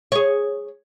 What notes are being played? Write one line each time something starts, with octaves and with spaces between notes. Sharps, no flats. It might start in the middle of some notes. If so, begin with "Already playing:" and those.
G#4 C#5